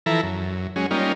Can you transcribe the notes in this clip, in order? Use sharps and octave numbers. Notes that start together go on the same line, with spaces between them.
E3 F3 E4 A4 A#5
F#2
F#3 G#3 C#4
G3 A#3 C#4 D#4 F4